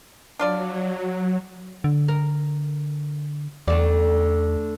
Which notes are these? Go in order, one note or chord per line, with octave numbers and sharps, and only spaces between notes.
F#3 D4 F4 D5
D3
A#4
E2 D3 A3 D5